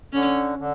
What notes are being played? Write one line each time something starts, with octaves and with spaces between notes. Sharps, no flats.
D3 C#4
D3